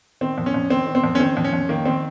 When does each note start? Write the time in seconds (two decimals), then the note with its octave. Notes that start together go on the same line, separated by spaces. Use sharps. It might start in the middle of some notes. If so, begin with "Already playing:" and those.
0.21 D#3 C4
0.38 F2
0.46 C#4
0.54 F2
0.70 D#3 C4
0.87 D#3
0.95 C4
1.04 F2
1.15 C#4
1.20 D#3 C4
1.37 F2
1.44 C#4
1.53 F2
1.69 D#3 A#3
1.85 D#3 C4